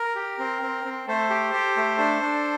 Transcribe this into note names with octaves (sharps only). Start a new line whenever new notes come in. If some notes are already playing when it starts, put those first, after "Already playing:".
Already playing: A#4
G4
C4
C4
C4
A3 A4 C5
G4
G4
A3
D4
D4